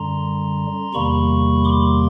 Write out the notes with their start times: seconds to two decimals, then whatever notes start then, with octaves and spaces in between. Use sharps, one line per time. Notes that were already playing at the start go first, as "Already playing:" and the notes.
Already playing: F#2 D3 G3 A#5 C6
0.94 E2 C3 D#3 G3 A#3 B5 C#6
1.64 C6 D6